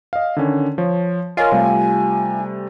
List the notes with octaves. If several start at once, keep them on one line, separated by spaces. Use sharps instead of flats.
D#5 F5
D3 D#3 C#4
F3 C#5
F4 A#4 C#5 D#5 G#5
C3 G3 A3